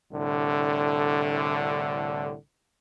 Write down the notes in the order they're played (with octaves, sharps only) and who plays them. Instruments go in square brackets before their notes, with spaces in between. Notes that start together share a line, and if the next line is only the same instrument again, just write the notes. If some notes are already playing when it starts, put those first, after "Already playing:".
[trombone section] C2 A2 D3